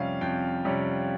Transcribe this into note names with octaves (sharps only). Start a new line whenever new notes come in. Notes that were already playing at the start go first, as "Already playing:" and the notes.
Already playing: F2 C3 G3 C#4 F5
F2 G5
C3 G3 C#4